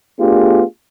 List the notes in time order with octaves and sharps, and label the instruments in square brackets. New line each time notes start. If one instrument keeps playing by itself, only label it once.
[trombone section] A3 B3 D4 F4 G4 G#4